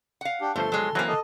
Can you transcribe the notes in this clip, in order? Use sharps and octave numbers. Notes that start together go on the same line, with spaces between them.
F5 F#5
D4 G4
G1 F3 A3 A4 C5 C6
F#3 G#3
E3 F#3 A#3 C4 C#4
A4 D#5